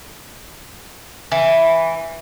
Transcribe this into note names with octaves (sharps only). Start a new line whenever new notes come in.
E3